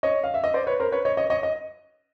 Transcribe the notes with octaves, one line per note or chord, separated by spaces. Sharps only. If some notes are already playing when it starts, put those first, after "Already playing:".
C#5 D#5
F5
E5
D#5
C5 D5
B4 C#5
A#4 C5
B4 C#5
C#5 D#5
C#5 D#5
C#5 D#5
D#5